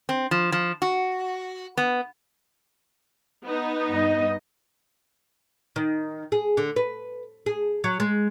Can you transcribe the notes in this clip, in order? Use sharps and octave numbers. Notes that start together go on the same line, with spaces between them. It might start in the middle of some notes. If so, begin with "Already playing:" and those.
C4
F3
F3
F#4
B3
B3 D#4
G2 D#5
D#3
G#4
D3
B4
G#4
F#3
G#3